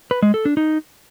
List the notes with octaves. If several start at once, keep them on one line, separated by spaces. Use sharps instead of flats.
B4
G#3
A4
D4
D#4